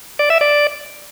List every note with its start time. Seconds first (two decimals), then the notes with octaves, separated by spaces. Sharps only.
0.19 D5
0.30 E5
0.41 D5